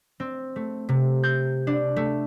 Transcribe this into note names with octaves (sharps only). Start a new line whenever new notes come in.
C4
A3
C3
G6
D4
A3